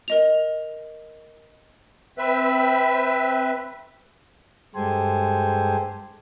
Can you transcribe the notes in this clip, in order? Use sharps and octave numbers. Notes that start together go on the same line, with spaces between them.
A#4 D#5 F7
C4 B4 E5
G2 G#3 G4 A4 C5 G#5